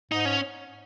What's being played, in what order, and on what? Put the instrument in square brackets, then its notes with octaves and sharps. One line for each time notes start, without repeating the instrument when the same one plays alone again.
[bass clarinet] G#2 [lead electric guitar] D#4
[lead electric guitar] C#4